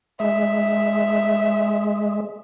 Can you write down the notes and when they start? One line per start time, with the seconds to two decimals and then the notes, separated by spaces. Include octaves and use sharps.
0.20 G#3 E5